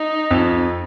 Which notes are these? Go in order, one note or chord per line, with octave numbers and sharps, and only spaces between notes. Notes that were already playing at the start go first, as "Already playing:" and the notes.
Already playing: D#4
F2